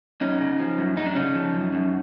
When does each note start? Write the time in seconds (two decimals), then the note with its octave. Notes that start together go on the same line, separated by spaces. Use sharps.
0.21 F#2 C#4 D#4
0.41 C#3
0.59 F3
0.78 F#2
0.97 F#2 D#4
1.06 D4
1.15 C#3 C#4 D#4
1.35 F3
1.54 F#2
1.73 F#2